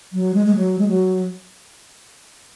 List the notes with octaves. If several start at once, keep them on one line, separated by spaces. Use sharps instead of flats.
F#3
G#3
G#3
F#3
G#3
F#3